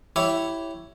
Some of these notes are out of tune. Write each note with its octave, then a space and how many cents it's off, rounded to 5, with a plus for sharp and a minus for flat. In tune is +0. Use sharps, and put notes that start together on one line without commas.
E4 +0 G4 -20 C#5 +0